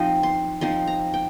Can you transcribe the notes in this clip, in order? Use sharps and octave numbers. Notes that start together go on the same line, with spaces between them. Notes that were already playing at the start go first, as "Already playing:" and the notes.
Already playing: F3 C4 D#4 D#5
C6
F3 C4 D#4 C6
A#5
G5